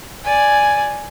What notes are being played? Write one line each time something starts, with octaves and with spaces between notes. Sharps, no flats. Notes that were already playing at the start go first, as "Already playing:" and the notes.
D5 G#5